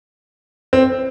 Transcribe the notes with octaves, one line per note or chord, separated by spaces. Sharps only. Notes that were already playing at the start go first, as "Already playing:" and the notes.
C4